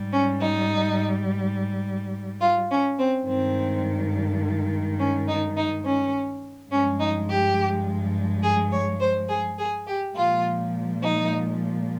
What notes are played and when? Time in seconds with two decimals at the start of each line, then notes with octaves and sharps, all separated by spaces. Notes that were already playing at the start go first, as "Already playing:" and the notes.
Already playing: G#2 G3
0.11 C#4
0.40 D#4
2.40 F4
2.70 C#4
2.98 C4
3.26 G2 D#3 G#3 C4
4.99 C#4
5.27 D#4
5.56 D#4
5.85 C#4
6.71 G2 F3 G#3 C#4
6.99 D#4
7.28 G4
8.42 G#4
8.71 C#5
8.99 C5
9.28 G#4
9.57 G#4
9.86 G4
10.14 A#2 F3 G#3 F4
11.01 D#4